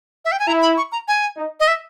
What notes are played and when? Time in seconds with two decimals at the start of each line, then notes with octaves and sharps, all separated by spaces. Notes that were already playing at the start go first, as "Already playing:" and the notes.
0.25 E5
0.32 G5
0.39 G#5
0.47 E4 A#5
0.62 B5
0.77 C#6
0.92 A#5
1.08 G#5
1.37 D#4
1.60 D#5
1.68 E5